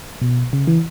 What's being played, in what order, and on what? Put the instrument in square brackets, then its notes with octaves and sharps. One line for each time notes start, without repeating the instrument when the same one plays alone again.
[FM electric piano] B2
C#3
E3